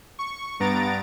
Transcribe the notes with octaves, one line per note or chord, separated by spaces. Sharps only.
C#6
G2 B3 A#5 A6 D7